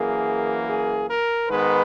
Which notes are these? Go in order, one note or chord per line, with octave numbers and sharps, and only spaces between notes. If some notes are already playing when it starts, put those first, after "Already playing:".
Already playing: F#2 E3 A#3 G#4
G#4
A#4
G#2 D#3 G#3 B3 B4